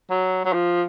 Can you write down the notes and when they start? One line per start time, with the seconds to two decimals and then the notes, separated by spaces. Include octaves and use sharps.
0.10 F#3
0.45 F#3
0.53 F3